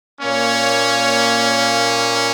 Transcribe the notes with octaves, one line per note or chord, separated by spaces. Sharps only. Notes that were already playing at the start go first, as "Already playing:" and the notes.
A#2 A#3 C#4 C#5